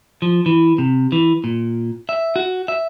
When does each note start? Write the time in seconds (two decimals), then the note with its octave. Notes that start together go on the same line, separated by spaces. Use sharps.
0.22 F3
0.46 E3
0.78 C3
1.12 E3
1.44 A#2
2.09 E5
2.36 F#4
2.68 E5